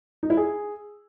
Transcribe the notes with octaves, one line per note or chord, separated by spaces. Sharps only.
D#4
E4
G#4